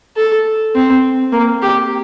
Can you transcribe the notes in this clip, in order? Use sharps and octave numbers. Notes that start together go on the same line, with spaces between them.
A4
C4
A#3
G4